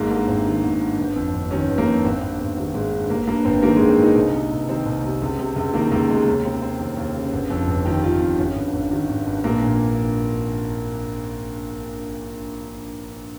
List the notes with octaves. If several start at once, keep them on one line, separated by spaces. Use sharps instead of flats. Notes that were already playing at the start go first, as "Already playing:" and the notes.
Already playing: G#1 G#2 A#3
G2 A#3
G#1 C4
D#3
G#1
G2
G1
F2
G1
D#3 C#4
G1
A#3
F2
G#1 C4
G2
G#1
D#3 C4
G#1 G#3
G2
G1 A#3
G2 A#3
G1 C4
D#3 A#3
G1 G#3
C4
G2
D#4
C2
C3
C2
D#3 C4
C2
C3
C#2
C3
C#2
D#3 A#3
C#2 A#3
C3 G#3
D#2 A#3
C#3 C4
C#3 C4
D#2
D#2
C#3
G1
F2
G1
D#3 G4
G1 F4
F2
G#1 C#4
G2
G#1
D#3
G#1
G2
A#1 A#3
A#2